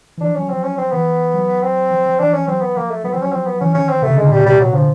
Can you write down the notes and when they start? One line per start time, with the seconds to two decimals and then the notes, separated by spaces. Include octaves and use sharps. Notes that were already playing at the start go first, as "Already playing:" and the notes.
0.17 E3
0.21 F3 D4
0.36 F#3 C#4
0.49 F3 C4
0.64 C#4
0.78 F3 C4
0.92 E3 B3
1.34 F#3
1.63 C4
1.91 F3
2.06 F3
2.19 E3 D4
2.34 C#4
2.48 F#3 C4
2.61 B3
2.76 F3 A#3
2.91 A3
3.04 F#3 B3
3.13 F3 C4
3.22 F#3 C#4
3.32 F3 C4
3.46 B3
3.60 E3 C#4
3.74 D#3 C#4
3.89 C4
4.02 C3 A3
4.10 C#3
4.18 D3 G#3
4.29 A#2 G3
4.38 B2
4.45 C3 G3
4.60 F#3
4.73 D3 F3